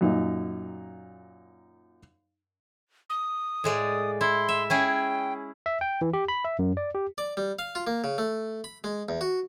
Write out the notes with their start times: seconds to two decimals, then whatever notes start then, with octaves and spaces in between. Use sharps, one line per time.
0.01 F#2 A#2 D#4
3.10 D#6
3.64 A2 G#3 D5
4.21 E4 C6
4.48 E5
4.70 C#4 E4 G#4 G5
5.66 E5
5.81 G5
6.01 E3
6.13 G4
6.28 B5
6.45 E5
6.59 F#2
6.77 D5
6.94 G4
7.18 D5
7.37 G3
7.59 F5
7.75 F4
7.87 A#3
8.04 C#3
8.18 A3
8.64 B5
8.84 G#3
9.09 E2
9.21 F#4